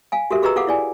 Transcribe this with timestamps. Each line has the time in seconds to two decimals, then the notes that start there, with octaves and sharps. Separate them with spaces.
0.12 F5 G#5
0.31 F#4 G4 A4 A#4 E5
0.42 F#4 G#4 B4 D#5 A#5 E6
0.56 F4 A4 F5 F#5 D6
0.67 E4 D5 G#5